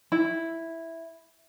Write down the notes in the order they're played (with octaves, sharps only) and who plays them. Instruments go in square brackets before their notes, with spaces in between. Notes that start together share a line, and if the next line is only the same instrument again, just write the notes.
[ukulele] E4